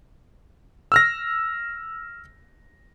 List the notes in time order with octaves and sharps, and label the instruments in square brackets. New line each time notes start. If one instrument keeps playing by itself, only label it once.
[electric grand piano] E6 F6 A#6